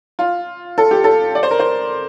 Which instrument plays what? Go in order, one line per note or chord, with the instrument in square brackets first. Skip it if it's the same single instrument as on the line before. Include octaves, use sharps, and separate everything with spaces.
[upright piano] F4
A4
G4
A4
D5
C5
A#4
C5